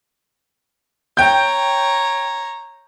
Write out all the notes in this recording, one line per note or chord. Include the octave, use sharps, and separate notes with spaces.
C#5 G5 A#5 G6